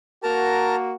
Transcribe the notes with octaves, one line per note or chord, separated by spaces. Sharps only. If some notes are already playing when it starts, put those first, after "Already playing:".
A#3 F#4 A#4 A5 A#5